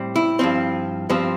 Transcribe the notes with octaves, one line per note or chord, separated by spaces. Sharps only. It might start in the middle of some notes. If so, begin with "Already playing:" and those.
Already playing: A2 G3 C4
E4
G2 F3 C4
G2 F3 C4